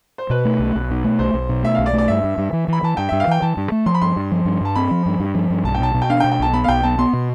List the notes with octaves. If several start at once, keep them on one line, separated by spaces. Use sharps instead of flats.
C5
B2 B4
A3
B1
B1
B2
A3
B1 C5
B1
B2
A3 E5
B1 F5
D5
A3
D5
G2 E5
G2
G2
E3
E3 B5
E3 A5
G2 G5
G2 E5
F5
E3 G5
E3 A5
G2
A3
F3 C6
B5
G2 C6
G2
F3
G2
G2 A5
C4 B5
F3
G2
G2
F3
G2
B1 A5
G5
B2 A5
B2
G5
D4 F5
G5
B2
G5
B1 A5
B3 B5
F5
B1 G5
B3 A5
B3 C6
B2